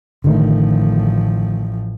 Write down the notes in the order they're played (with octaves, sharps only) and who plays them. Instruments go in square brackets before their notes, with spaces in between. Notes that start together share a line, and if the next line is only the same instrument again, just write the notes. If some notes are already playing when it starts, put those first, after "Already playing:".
[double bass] A1 F3 [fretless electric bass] D3 D#3 A3